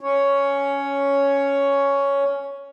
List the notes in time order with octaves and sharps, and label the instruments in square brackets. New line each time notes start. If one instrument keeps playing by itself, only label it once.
[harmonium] C#4 C#5